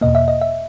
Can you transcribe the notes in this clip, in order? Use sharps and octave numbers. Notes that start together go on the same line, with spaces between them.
E2 B2 A#3 D#5
E5
D#5
E5